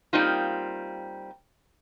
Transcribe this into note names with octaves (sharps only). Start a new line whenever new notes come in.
G3 A#3 C4 D#4 F4